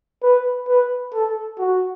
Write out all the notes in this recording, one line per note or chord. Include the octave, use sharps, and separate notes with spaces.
B4
B4
A4
F#4